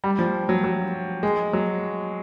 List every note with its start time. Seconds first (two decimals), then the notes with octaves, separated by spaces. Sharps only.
0.04 G3
0.19 F3
0.49 F#3
0.64 F#3
1.23 G#3
1.53 F#3